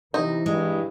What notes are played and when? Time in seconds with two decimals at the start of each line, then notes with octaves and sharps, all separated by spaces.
0.14 C3 E3 D#4
0.46 G2 G#3